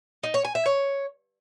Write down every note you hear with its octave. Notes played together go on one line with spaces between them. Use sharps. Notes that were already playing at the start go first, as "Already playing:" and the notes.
D#4
C#5
G#5
E5
C#5